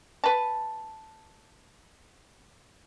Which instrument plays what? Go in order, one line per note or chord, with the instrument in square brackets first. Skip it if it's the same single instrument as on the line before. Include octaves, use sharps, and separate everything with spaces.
[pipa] B4 A5